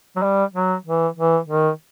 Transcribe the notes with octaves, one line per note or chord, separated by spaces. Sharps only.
F#3
G3
F#3
E3
E3
D#3